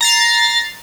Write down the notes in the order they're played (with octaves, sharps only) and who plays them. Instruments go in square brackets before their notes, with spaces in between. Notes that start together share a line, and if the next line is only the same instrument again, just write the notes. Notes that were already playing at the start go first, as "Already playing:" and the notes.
[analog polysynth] A#5 A6 C7